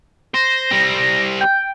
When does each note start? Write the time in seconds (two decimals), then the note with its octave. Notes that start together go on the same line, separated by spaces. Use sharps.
0.34 C5 A#6
0.71 G3 C4
1.41 G5